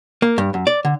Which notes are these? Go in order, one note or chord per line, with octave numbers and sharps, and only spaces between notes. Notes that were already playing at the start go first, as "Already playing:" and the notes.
A#3
G2
F#2
D5
D3